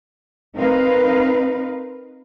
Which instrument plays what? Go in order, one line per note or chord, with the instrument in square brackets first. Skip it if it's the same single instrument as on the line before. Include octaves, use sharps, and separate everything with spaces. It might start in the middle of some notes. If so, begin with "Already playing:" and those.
[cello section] C4 D#4 A#4 B4 F5